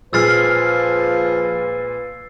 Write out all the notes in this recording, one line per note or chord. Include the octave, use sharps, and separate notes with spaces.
A#2 F3 G#3 B4 E6 F6 A6 C7